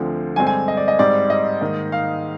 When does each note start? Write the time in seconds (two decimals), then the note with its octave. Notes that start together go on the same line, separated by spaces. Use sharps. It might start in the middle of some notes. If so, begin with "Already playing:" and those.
Already playing: D2 D3 F3 C4
0.36 G2 D3 G#3 C4 G#5
0.47 G#5
0.68 D#5
0.77 D5
0.88 D#5
0.99 G#2 G3 C4 D5
1.30 D#5
1.61 G#2 D#3 A#3
1.92 F5